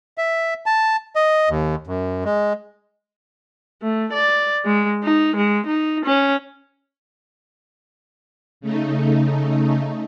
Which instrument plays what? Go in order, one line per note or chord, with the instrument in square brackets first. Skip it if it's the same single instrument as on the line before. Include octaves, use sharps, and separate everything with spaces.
[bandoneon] E5
A5
D#5
D#2
F#2
G#3
[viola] A3
D5
G#3
D#4
G#3
D#4
C#4
[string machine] C#3 A3 D#4